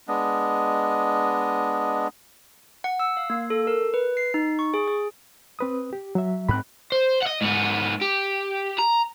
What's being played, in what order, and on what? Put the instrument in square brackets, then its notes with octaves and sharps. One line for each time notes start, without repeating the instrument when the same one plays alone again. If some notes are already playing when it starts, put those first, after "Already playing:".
[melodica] G#3 B3 D4 D#5
[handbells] F#5
E6
F5
A#3
A4
A#4
B4
C7
D#4
C#6
G#4
G#4
[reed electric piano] C4 B4 D#6
G4
F#3 E5
[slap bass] G#2 C4 [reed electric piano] B5 F#6
[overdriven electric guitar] C5
D#5 F#5
G#2 B3
G4
A#5